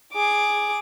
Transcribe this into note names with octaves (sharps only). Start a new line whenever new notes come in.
G#4 D6